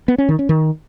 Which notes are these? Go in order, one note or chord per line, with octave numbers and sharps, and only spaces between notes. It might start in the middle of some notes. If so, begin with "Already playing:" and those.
B3
C#4
D#3
C#4
D#3